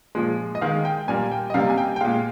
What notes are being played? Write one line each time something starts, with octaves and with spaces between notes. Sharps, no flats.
A#2 F3 G#3
D#5
D#3 G#3 F5
G5
A#2 G3 A#3 G#5
G5
D#5
C3 G3 A#3 F5
G#5
G5
G5
A#2 G#3 F5